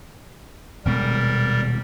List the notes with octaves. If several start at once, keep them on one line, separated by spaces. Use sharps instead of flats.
D#1 B2 G3 G#3 A#4